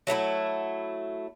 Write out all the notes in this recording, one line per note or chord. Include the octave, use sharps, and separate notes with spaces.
F#3 A3 D#4 E4